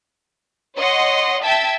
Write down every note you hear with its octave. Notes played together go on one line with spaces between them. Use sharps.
C#5 D#5 F#5 C6
E5 G5 A5 G#6 B6